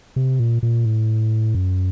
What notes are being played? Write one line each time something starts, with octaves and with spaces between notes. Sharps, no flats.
C3
A#2
A#2
A2
F#2